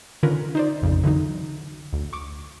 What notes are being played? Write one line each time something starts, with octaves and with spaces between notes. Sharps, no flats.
D3 D#3 C#4 F4 A#4 B4
D#4 C5 D5
A#1 F2 C#3
D3 E3 F#3 D#4
D2
C#6 D6